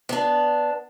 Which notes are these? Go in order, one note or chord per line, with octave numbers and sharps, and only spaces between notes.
B3 D4